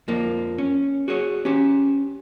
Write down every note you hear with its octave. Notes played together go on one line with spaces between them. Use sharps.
F2 F3 A#3
C#4
F#4 G#4 C#5
C#4 G4